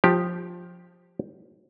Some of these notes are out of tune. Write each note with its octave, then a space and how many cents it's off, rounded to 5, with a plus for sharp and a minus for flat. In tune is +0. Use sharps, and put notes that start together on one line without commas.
F3 +15 G4 +0